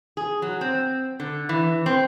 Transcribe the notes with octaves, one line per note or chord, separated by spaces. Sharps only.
G#4
F#3
C4
D3
E3
C4